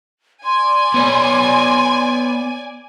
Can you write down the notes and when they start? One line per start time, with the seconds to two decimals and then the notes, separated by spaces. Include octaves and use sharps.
0.45 D5 G#5 C6
0.94 B3 C#5